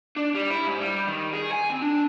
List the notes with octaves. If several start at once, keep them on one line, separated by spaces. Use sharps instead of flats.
D4
G3
E4
G#2
G3
D#3
G#4
G#5
C4
D4